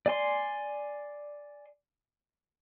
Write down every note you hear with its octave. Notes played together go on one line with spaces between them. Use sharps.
D5 G#5 C6